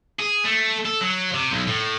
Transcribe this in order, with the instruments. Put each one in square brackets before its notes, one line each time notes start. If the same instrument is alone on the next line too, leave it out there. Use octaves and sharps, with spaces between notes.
[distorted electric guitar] G#4
A3
A4
F#3
C3
B1
A2